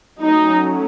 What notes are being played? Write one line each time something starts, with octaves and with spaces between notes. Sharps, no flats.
F#3 A3 C#4 D#4